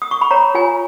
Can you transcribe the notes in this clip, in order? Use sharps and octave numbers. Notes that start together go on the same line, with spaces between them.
D#6
C#6
B5
C#5 A#5
F4 G#5